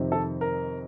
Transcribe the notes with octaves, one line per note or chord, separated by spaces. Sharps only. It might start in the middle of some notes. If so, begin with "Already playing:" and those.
Already playing: F2 C3 D#3
A4
A#4